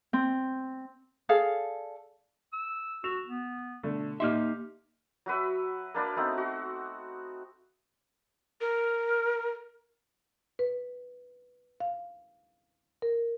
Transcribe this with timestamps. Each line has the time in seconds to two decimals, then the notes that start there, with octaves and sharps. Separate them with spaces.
0.13 C4
1.29 G#4 A4 D5 F5
2.53 E6
3.04 F#4 E6 E7 F7
3.27 B3
3.83 B2 D3 A3
4.20 A#3 D#4 G4 E5 C6 F6
5.26 F#3 F#4 B4 E5
5.94 A#3 D4 B4 D5
6.16 A3 B3 C4 D#4
6.38 F#4
8.61 A#4
10.59 B4
11.80 F5
13.02 A#4